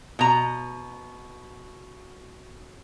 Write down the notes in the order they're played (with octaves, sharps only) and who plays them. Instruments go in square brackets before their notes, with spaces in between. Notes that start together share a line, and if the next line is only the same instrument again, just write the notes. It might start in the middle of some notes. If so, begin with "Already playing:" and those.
[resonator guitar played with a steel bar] B2 A#5